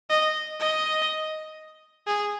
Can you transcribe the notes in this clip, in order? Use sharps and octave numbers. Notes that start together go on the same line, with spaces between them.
D#5
D#5
G#4